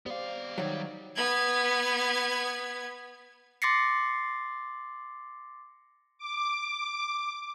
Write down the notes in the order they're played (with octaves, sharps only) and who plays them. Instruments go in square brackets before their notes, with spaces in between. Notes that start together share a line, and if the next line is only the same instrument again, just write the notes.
[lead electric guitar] B3 F5 [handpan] G4 C5 D5
[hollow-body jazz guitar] D#3 F#3 [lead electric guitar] G3 [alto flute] C#5
[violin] B3 G#6
[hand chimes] C6 D6 A6 A#6 C7 C#7
[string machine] D6